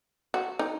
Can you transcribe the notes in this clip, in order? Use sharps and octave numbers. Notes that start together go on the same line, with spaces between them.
F#4
D#4